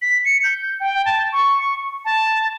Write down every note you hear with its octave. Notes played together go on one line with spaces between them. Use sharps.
B6
C#7
G6
G5
A5
C#6
A5